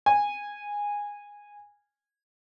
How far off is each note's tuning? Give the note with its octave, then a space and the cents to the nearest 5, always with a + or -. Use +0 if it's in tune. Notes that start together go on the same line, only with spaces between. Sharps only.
G#5 -15